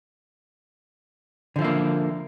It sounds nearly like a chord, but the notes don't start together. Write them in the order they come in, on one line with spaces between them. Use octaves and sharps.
D3 F3 E4 A#3